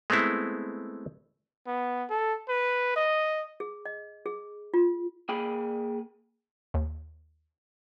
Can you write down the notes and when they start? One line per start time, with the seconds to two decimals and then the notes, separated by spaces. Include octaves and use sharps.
0.10 G#3 A3 B3 C4 E4
1.66 B3
2.10 A4
2.48 B4
2.96 D#5
3.60 G#4
3.85 D#5
4.26 G#4
4.74 F4
5.29 A#3 G#4 G5 G#5 B5
6.74 D#2